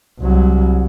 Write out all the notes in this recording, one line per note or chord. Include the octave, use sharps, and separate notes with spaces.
C2 F#3